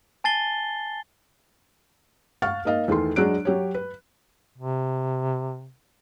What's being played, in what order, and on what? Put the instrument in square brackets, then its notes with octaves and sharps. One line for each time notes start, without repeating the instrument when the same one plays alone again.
[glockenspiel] G#5 A5 A6 C7 G7
[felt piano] F5 F#5 C#6 F6 A6
A#3 D#4 D#5 F5
E2 D#3 A3 C6
F#3 G#3 D4 F#6 D7
F#3 G4 C#5
B4
[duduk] C3